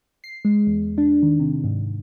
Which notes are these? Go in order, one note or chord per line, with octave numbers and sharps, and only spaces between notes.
C7
G#3
E2
D4
D#3
C3
G#2